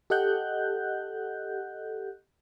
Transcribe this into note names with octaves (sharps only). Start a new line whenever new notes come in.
G4 A4 D#5 F#5 F#6 G6